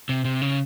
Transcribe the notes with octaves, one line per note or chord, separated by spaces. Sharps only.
C3
C3
C#3